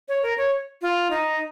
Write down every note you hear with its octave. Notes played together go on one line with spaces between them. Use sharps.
C#5
A#4
C#5
F4
D#4